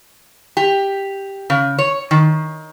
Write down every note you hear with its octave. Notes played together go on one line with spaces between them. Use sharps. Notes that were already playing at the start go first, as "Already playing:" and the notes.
G4
C#3
C#5
D#3